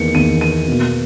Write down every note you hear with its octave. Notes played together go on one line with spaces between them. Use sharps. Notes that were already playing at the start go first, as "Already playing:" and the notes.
Already playing: E2 D#3 A#3 C#7
E2 D#3 A#3 D#7
D#7
B2 A#3